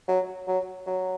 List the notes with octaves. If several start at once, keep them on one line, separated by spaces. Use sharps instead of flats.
F#3
F#3
F#3